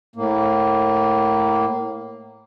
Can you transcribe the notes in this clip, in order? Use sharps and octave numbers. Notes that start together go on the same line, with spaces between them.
A2 A#3